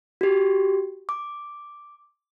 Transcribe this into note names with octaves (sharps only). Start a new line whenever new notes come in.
F#4 G4
D6